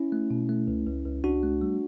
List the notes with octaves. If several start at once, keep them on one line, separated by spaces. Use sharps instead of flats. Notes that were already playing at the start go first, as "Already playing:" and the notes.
Already playing: C#4 E4
A3
B2
A3
C#2
C#2
C#2
C#2 D4 F#4
A3
G3